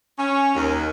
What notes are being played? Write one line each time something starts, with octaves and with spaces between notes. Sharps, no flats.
C#4
D#2